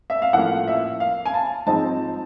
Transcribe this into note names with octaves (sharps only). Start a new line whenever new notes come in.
E5
F5
A2 F3 A#3 C#4 F#5
E5
F5
G#5
A5
G#2 F3 G#3 C4 D#4 A5